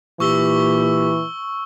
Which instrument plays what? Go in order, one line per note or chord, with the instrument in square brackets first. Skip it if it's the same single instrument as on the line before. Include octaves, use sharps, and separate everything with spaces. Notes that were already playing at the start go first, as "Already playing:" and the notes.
[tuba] A#2 [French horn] E3 [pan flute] G4 [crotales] C#6 E6 G7